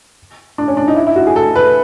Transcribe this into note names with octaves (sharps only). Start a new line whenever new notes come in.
D4
C#4
D4
D#4
E4
E4
F#4
G#4
A4
B4